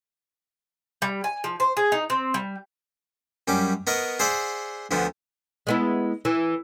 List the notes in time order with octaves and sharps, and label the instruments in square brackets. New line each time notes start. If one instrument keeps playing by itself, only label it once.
[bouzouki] G3
G#5
F3
C5
G#4
D#4
C4
G3
[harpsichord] F#2 G3 C#4 D6
B3 A#4 D#5 C#6
G#4 C5 D5 E5 F#5
D2 D3 F3 B3
[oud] G#3 B3 E4
E3